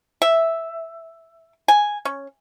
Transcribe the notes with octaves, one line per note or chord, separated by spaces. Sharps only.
E5
G#5
C#4